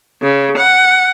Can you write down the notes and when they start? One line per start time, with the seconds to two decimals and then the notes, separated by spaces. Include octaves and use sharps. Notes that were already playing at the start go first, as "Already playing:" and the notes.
0.21 C#3
0.57 F#5